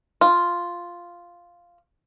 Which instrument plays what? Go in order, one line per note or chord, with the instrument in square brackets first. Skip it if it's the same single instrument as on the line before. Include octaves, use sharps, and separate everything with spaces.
[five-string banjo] F4